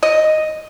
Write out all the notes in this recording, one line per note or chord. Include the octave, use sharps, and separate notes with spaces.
D#5